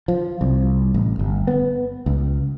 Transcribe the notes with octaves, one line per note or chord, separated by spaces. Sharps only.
F3
C2
A1
G1
B3
C#2